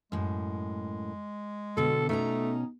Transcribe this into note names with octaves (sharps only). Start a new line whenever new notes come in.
F#2 A2 G#3
B2 D3 A4
B2 A3 C#4 D#4 A#5